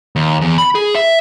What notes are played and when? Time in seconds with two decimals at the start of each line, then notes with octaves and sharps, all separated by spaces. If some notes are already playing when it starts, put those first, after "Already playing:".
0.16 D#2
0.41 E2
0.58 B5
0.75 G#4
0.95 E5